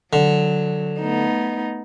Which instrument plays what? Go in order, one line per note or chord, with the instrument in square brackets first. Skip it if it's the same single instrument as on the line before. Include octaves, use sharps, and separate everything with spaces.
[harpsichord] D3 [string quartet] F#3
[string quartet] A3 B3 D#4